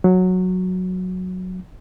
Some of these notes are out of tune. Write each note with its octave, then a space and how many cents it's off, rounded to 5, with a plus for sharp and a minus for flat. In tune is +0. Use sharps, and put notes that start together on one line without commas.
F#3 -10